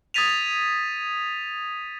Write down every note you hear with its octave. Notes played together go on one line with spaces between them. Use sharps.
D#6 G#6 A6 B6 D#7 F7